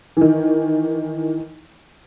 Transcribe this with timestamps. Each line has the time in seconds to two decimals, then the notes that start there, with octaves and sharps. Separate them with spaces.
0.17 D#3 E3